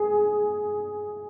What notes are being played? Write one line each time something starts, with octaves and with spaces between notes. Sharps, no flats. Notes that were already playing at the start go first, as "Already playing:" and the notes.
Already playing: G#4